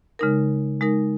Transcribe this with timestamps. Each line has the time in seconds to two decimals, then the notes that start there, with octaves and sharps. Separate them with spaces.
0.19 C#3 G#3 D#4 A#4
0.81 G#3 D#4 A#4